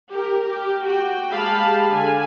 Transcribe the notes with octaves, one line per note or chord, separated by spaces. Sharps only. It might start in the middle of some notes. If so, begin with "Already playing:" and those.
G4 A#4
G4
F#4 G5
G#3 G4 G#4 F5 A5 B5
D3 G#5